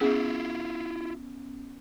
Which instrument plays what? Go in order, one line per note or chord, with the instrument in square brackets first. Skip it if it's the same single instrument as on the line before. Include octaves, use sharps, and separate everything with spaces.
[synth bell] B3 C#4 [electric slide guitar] E4 F4 [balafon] G#4